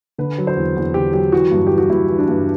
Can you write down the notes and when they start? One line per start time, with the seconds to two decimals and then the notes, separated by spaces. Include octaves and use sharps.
0.18 D3 B4
0.38 F#3
0.47 C5
0.56 E2
0.76 E2
0.94 D3 G4
1.13 F#3 G4
1.32 E3 F#4
1.51 G2
1.67 E3 G4
1.78 F#4
1.90 G2 E4
2.09 E3
2.18 D4
2.28 G2